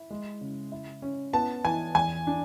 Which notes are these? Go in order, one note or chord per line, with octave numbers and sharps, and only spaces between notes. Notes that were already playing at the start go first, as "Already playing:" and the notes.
Already playing: E4
G#3
C#3
E4
C#4
B3 A5
E3 G#5
E2 G#5
D4